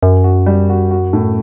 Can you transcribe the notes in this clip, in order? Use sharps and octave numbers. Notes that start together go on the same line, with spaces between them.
F#2 F#4
F#4
G3
F#4
F#4
A2